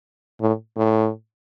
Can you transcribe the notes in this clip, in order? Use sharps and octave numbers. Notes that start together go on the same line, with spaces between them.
A2
A2